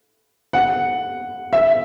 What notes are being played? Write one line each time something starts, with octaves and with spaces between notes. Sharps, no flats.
F#5
E5